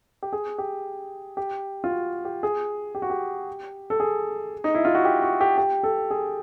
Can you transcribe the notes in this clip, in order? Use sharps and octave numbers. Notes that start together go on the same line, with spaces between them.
G4
G#4
G4
G4
F4
F#4
G4
G#4
G4
F#4
G4
A4
G#4
D#4
E4
F4
F#4
G4
F#4
G4
G4
A4
G#4